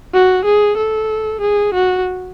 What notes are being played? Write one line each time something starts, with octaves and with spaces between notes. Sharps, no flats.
F#4
G#4
A4
G#4
F#4